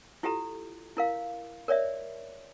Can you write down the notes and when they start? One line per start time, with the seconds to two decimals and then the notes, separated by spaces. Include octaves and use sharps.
0.23 E4 F4 G4 A4 A#5
0.97 E4 A#4 F5
1.68 A#4 C#5 D5 E5